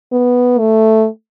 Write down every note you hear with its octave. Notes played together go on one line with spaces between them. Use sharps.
B3
A3